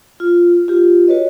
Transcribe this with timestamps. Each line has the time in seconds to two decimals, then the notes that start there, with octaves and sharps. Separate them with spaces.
0.20 F4
0.68 F4 G4
1.08 F#4 B4 C#5 D#5